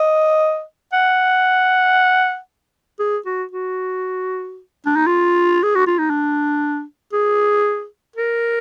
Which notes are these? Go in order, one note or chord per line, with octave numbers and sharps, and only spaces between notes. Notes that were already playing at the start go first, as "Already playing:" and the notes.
Already playing: D#5
F#5
G#4
F#4
F#4
D4
D#4
F4
G#4
F#4
F4
D#4
D4
G#4
A#4